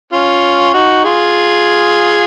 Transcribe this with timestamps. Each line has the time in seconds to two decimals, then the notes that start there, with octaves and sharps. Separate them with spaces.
0.13 C#4 F4
0.74 D#4 F#4
1.04 F4 G#4